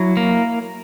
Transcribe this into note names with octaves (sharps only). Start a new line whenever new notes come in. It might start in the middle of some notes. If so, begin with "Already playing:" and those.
Already playing: F#3 E4
A#3